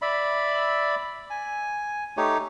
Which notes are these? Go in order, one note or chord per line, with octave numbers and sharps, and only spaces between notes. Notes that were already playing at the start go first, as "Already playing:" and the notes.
D5 E5 B5
G#5
A3 D#4 G4 C#5